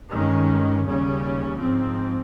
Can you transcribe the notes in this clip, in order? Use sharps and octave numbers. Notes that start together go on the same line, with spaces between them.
G2 D#3 G#3 C#4
D#2 C#3 G3 C#4
G#2 F3 C4